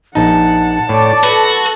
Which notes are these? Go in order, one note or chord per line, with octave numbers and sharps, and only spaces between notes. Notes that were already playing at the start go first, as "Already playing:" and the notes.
A#1 D#4 F#5 A5
A2 C#5 D5
F#4 A4 B4